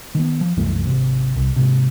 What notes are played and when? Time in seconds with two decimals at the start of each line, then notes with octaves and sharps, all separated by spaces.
0.15 D#3 B3
0.41 F3
0.57 C2 F#2 E3 A3
0.86 G#1 C3
1.36 C2
1.56 G#2 C3